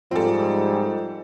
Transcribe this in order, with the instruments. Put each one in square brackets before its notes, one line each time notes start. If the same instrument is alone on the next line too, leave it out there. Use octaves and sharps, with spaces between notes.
[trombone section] G#2 G3 [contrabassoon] F3 [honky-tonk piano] C4 A4